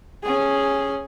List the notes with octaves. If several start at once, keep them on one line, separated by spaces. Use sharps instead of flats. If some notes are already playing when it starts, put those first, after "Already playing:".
C#4 G#4